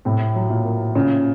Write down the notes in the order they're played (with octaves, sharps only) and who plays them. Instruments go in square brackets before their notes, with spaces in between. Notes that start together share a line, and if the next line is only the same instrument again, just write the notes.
[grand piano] A2 [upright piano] C3
[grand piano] F#3
[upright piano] A#2
[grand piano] A#3
[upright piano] A#2 C#3 [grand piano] C#4